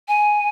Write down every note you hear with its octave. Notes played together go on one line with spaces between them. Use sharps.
G#5